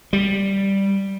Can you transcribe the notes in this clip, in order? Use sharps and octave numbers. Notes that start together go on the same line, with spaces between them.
G3